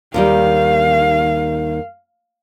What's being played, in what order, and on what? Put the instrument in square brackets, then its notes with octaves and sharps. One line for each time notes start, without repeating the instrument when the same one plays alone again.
[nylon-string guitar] D#2 D#3 G3 [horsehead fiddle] F5